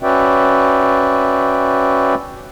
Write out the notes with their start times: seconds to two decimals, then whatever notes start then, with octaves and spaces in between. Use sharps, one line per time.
0.03 C#4 F#4 B4 D5 E5 G5